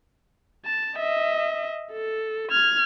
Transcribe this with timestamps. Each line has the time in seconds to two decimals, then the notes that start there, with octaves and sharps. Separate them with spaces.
0.65 A5
0.98 D#5 E5
1.92 A4
2.51 F6 G#6